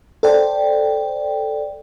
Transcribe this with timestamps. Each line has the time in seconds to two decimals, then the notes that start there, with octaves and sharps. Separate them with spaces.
0.23 A4 C5 D5 G5